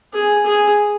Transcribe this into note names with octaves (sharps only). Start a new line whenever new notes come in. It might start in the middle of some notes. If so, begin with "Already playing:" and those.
G#4
G#4